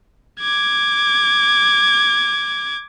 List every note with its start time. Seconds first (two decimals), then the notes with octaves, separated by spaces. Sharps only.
0.40 D6 G#6